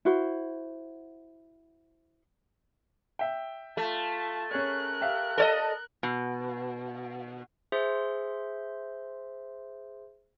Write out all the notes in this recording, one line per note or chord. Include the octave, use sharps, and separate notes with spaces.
E4 F#4 C5
E5 G5
A3 F4 A5
C#4 G#4 A#4 C#5 F#6
G4 E5 F5
A4 C#5 D#5
B2
G#4 C5 E5 C6